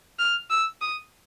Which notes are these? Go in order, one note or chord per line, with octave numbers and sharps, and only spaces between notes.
F6
E6
D#6